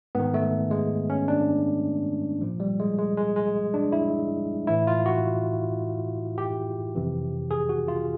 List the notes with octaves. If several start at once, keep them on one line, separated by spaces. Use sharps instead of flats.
G#2 D#3 B3
A3
G#3
C#4
D4
A#2 F3
G3
G#3
G#3
G#3
G#3
D4
E4
A2 E3 E4
F4
F#4
G4
F2 C3 E3
G#4
F#4
F4